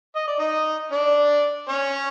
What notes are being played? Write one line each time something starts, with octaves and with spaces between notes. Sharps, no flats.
D#5
D5
D#4 D#5
D4 D5
C#4 C#5